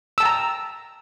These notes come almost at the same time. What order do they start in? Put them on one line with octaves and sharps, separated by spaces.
E6 A5 G5 A#5